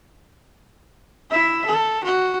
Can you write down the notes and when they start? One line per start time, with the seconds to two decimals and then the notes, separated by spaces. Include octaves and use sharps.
1.31 E4 E5
1.66 A4
2.04 F#4